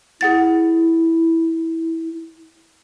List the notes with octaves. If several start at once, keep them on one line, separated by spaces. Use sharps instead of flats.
E4 G#4 F#5 A6